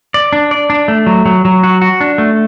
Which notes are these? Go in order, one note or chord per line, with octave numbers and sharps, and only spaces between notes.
D5
D4
D5
D4
A3
F#3
F#3
F#3
F#4
F#4
D4
A3